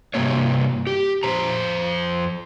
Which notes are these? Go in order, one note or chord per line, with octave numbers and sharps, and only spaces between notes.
G2 C3 D#3 A#3 C4 C#5
G4
F2 C5 A#5